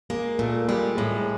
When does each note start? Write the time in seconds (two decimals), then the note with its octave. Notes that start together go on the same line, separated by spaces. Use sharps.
0.10 G#3 A#3
0.39 A#2 A3
0.68 G3 G#3
0.98 A2 G#3